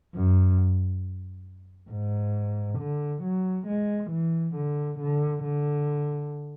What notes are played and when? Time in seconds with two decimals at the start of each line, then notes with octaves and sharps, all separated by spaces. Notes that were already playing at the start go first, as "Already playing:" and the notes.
0.14 F#2
1.90 G#2
2.79 D3
3.22 F#3
3.67 G#3
4.11 E3
4.55 D3
4.99 D3
5.43 D3